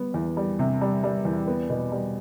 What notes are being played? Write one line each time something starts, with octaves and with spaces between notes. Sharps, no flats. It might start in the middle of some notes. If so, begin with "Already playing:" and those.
Already playing: G3 B3
E2
G3
C3
G3
G3
E2
B3
B2
G3